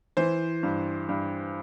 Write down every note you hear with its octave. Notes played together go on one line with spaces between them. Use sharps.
E3 C5
G2
G2